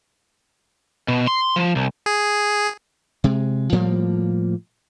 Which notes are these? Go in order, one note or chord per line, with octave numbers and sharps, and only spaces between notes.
B2
C6
F3
C2
G#4
C3 G#3
A2 F3 G3 A#3